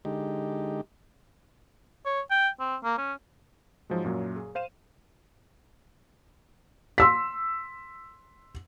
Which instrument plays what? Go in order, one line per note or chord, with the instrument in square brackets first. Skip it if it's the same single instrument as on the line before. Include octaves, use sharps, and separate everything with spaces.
[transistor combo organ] D3 G#3 D#4 G4
[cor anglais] C#5
G5
C4
A#3
C#4
[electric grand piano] G#2 F3 F#3 G#3
F#2 A#2 F#3
G#4
C5 F5 D#7 E7
[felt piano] C6 E6 B6